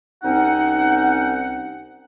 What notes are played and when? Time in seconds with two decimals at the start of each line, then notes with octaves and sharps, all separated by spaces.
0.23 C2 C4 C#4 D#4 F#5